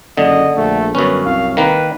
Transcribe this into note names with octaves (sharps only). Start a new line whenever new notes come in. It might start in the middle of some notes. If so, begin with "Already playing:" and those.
F#1 D3 D#5
A#1 A3
G1 F#2 C#4 B4
C2 F5
D#3 A#3 B4